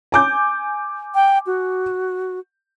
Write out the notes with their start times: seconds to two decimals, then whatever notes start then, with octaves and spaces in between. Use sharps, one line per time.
0.12 G#5 D6 G6
1.15 G5
1.47 F#4